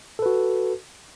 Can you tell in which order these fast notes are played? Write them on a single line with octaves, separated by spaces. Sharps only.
A4 B4 F#4